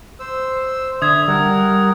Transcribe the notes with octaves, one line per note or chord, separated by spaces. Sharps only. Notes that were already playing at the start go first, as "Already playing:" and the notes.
C5 E6
D3 E5 D#6 G#6
G3 A#4 F#5